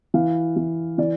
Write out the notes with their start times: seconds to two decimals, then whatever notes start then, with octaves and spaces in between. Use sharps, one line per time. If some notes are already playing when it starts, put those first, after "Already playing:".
0.14 E3 F5
0.56 E3
0.98 E3 D5